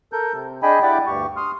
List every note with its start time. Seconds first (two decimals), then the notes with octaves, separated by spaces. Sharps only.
0.13 A4 A#4 G6
0.33 C3
0.63 D4 G#4 D#5 G5 G#5 B5
0.83 E4 G4 D5 F#5 G5 D6
1.07 D2 G2 G4 C#6
1.37 C6 D#6 F6